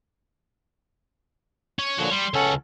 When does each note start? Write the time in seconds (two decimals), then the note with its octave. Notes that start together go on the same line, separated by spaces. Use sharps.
1.79 C#4
1.98 A#2 D3 F3 F#4 C#5
2.11 G3 C6
2.34 C#2 C#4 A4 F#5